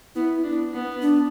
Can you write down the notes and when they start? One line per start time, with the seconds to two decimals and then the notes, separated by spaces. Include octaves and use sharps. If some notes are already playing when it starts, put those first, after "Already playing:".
0.15 B3 E4
0.44 D4
0.74 B3
1.02 D4